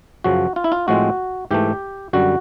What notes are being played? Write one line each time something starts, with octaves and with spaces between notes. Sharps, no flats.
F#2 C#3 F3 F#4
F4
E4
F4
A2 F3 G#3 C4 F#4
G#2 E3 A3 G4
F#2 D3 G3 F#4